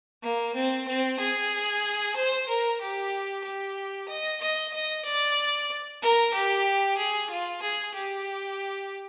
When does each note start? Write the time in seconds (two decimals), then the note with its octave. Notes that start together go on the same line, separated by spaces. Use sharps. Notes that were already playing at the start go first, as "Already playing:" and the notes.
0.22 A#3
0.55 C4
0.87 C4
1.19 G#4
2.16 C5
2.48 A#4
2.80 G4
3.44 G4
4.08 D#5
4.41 D#5
4.73 D#5
5.04 D5
6.01 A#4
6.33 G4
6.97 G#4
7.30 F4
7.62 G#4
7.94 G4